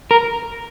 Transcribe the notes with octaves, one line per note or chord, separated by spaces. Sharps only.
A#4